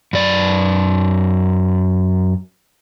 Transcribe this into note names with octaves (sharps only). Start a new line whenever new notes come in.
F#2 D5